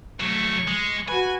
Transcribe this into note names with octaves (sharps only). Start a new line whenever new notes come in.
F#3 A3 C#6
G#3
F#4 B4 G#5